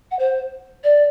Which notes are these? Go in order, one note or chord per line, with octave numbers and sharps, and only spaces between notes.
F#5
C5
D5